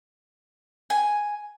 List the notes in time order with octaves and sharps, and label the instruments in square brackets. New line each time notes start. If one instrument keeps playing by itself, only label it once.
[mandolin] G#5